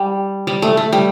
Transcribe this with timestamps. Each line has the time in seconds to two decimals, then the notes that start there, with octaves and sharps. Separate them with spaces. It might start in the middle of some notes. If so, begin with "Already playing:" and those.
Already playing: G3
0.47 G3
0.62 A3
0.77 A3
0.93 G3